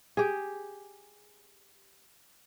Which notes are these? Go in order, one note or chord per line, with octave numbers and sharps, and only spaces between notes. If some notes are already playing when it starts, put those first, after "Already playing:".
G4 G#4